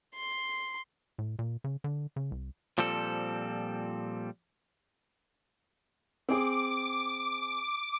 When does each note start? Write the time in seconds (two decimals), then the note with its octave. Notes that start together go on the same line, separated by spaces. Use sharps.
0.15 C6
1.19 A2
1.39 A#2
1.64 C#3
1.84 D3
2.16 C#3
2.31 C2
2.78 A#2 F3 G3 C4 A4
6.29 C4 G#4 D6